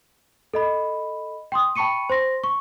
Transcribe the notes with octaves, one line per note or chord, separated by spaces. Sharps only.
A4 D#5 B5
G5 C6 D#6
G5 A5 B5 C#6 C#7 D#7
C5 C6 A#6
C#6